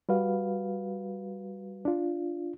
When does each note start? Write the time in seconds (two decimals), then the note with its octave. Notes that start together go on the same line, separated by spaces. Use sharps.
0.09 G3 F#4 B4 F5
1.85 D4 F4